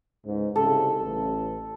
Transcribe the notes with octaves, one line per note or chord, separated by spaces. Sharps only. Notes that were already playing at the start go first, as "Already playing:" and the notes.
C#2 G#2
C2 C#3 A4
A1